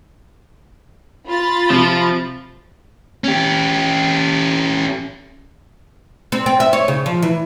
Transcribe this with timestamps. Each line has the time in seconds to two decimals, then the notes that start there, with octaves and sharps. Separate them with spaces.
1.27 F4 B5 A6
1.70 C3 F3
3.24 C#4 G4
6.32 C4
6.46 C4
6.60 E5
6.73 C#5
6.88 C#3
7.06 F3
7.22 E3